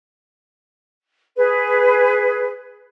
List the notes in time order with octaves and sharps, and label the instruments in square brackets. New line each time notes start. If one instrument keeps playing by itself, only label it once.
[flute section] G#4 B4